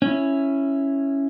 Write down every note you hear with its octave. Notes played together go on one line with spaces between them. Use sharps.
C#4 E4